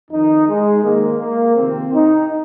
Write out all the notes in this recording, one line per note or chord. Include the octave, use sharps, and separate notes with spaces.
F2 D#3 D#4
G#3
G#2 D#3 A#3
A#3
F2 C3 D#3 C4
D#4